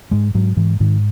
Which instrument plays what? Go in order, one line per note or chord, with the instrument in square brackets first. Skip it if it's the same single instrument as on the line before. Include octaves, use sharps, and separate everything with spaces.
[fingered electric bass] G#2 G#3
G#2 F#3
G#2 E3
G#2 D#3